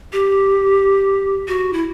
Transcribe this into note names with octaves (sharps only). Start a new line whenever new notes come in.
G4
F#4
E4